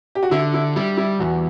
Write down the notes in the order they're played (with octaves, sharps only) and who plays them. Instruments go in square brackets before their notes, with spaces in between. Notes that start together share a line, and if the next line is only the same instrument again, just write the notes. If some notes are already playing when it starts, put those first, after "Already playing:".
[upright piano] G4
F#4
[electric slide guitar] D3 [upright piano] E4
[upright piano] E4
[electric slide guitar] G3 [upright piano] E4
[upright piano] E4
[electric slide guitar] E2 [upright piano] F#4